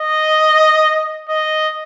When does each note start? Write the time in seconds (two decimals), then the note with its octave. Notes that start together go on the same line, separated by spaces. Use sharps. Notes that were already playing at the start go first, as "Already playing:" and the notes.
Already playing: D#5
1.29 D#5